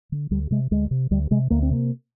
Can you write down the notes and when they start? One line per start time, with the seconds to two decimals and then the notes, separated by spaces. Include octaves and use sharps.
0.12 D3
0.31 D2 G3
0.51 C3 G#3
0.71 D2 G#3
0.91 C3
1.11 D2 G3
1.31 C3 G#3
1.50 D2 A#3
1.63 C4
1.70 C3 A#3